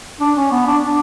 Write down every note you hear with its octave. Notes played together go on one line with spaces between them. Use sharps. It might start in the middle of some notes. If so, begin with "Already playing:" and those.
D4
C#4
B3
D4
D4